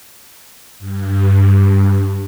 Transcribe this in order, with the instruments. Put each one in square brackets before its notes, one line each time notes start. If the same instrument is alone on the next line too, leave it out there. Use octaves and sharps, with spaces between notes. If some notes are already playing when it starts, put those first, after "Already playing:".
[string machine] G2